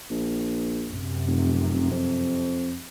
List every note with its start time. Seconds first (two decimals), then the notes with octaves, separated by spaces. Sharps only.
0.10 A#1
0.87 F#2 C3
1.27 F1
1.91 F2